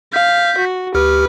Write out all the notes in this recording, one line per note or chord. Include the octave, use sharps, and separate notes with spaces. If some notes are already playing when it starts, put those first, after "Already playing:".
F5 G6 B6
F#4
D2 G4 B4 F6